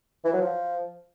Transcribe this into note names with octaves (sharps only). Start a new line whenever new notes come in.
E3
F#3
F3